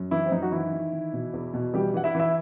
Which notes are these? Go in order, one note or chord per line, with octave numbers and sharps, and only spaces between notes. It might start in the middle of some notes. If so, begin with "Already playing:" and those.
Already playing: F#2
E3 E4
C4
F#2 D#4
F#4
D#3 E3 E4
D#3
D#3
B2
E2
B2
E3 G3 G4
E3 F#5
E4 E5
E3
E4 E5